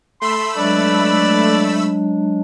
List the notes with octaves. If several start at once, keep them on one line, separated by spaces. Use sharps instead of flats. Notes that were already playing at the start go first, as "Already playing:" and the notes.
A3 B5 C6 E6
F#3 G#3 D4 B4 D5